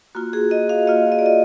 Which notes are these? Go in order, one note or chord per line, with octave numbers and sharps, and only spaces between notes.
A#3 F4 F#4
G#4
D#5
F5
A#3 F4 D#5
D#5
D5
D#5